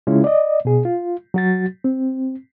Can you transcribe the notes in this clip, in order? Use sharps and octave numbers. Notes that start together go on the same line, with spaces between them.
C#3 G#3 C#4 E4 F4
D5 D#5
B2 G#4
F4
F#3 F#4 A6
C4